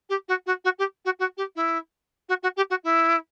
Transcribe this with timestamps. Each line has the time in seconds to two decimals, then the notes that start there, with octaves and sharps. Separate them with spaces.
0.09 G4
0.28 F#4
0.46 F#4
0.64 F#4
0.79 G4
1.05 F#4
1.19 F#4
1.37 G4
1.56 E4
2.29 F#4
2.43 F#4
2.56 G4
2.70 F#4
2.84 E4